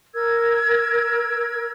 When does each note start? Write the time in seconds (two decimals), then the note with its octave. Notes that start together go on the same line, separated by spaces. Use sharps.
0.14 A#4 E6 G#6